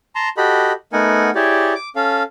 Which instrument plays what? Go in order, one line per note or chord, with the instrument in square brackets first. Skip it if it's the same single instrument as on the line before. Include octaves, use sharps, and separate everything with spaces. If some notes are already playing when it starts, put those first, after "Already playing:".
[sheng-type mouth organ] A5 A#5 C6
F#4 G4 A4 D#5 B5
A3 B3 D#4 A#4 F#5 G#5
E4 G4 G#4 C#5 D5
D6
C#4 A4 F5